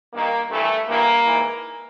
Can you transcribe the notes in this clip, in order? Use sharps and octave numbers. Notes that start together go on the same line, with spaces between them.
G2 D#3 A#3
G2 E3 A3
G2 E3 A#3
G#2 E3